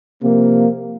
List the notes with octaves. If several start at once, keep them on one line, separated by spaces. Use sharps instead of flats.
C3 F3 A#3